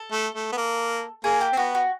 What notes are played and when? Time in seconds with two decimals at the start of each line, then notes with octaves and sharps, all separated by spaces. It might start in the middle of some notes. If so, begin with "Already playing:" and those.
Already playing: A4
0.12 A3
0.34 A3
0.52 B3
0.57 A#3
1.24 A#3 G#4
1.41 G4
1.52 C4
1.57 B3 F#4
1.75 F#4